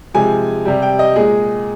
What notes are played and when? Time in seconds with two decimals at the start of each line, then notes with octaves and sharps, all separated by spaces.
0.14 C3 F3 G#3 G#5
0.65 C3 G3
0.82 G5
0.99 D#5
1.16 A#2 G#3 G#4